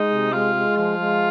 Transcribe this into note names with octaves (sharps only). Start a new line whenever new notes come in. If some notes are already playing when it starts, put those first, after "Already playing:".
Already playing: G#3 D#4
C3
G#3 F4
G#3
F3 F4
G#3